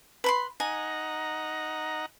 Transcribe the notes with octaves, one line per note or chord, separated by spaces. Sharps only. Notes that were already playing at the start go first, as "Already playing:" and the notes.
B4 B5 C6
D#4 F#5 G#5 A#5